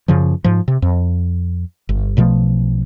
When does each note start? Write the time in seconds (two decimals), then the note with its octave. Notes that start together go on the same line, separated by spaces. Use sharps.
0.08 F#2 C#3 F3
0.44 G#2 F3
0.68 C3
0.82 F2
1.89 G1
2.17 B1 B2 F3 A3